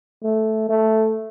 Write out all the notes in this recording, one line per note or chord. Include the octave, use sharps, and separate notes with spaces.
A3
A3